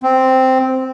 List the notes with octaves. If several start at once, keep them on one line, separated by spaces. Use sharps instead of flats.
C4